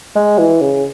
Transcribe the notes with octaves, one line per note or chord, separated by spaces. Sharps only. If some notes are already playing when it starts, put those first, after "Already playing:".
G#3
E3
C#3